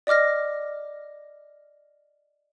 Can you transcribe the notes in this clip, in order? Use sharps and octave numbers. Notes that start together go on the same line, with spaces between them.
D5 D#5 D6 F6 A#6